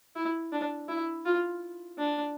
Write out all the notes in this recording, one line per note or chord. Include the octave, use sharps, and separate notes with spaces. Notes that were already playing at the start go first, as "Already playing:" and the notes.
E4
D4
E4
F4
D4